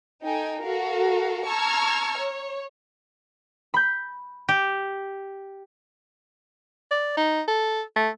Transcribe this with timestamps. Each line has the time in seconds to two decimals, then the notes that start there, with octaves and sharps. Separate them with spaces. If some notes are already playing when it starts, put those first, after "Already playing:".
0.22 D#4 A4 G5 G#5
0.63 F#4 A4 A#4 F5
1.46 A5 A#5 C#6 E6 F6 G#6
2.18 C#5
3.74 B5 G6
4.49 G4
6.91 D5
7.17 D#4
7.48 A4
7.96 A3